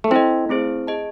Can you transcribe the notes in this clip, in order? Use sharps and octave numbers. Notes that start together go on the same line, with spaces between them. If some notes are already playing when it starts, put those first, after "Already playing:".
A3
C4 E4 A4 D#5
A3 C4 E4 G#4 C5
G#4 D#5 A5